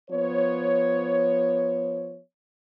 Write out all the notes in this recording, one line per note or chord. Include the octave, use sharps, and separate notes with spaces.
F3 B3 C#5